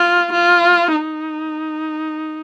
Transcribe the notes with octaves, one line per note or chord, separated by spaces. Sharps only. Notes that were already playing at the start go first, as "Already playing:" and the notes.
Already playing: F4
F4
D#4